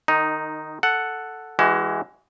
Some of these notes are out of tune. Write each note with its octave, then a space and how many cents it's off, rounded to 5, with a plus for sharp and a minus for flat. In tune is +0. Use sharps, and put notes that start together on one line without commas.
D#3 -25 D#4 +0
A4 +0 F#5 +0
E3 +10 G#3 -10 F#4 +35